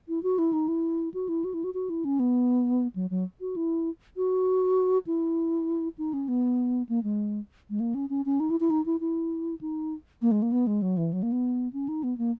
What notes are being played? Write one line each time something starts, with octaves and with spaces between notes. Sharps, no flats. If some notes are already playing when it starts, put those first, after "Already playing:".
E4
F#4
E4
D#4
E4
F#4
E4
F#4
E4
F#4
F#4
E4
C#4
B3
F#3
F#3
F#4
E4
F#4
E4
D#4
C#4
B3
A#3
G#3
G#3
A#3
C#4
C#4
C#4
D#4
E4
E4
D#4
E4
E4
D#4
A#3
G#3
A#3
B3
G#3
F#3
E3
F#3
A#3
B3
C#4
D#4
B3
A#3